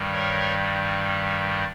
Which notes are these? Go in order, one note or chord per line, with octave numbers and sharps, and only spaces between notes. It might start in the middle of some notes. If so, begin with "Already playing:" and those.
Already playing: G2 D#3 G3
A#4 C#5